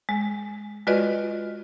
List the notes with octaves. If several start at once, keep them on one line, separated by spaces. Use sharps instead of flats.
G#3
G#3 F4 F#4 B4 D5 D#5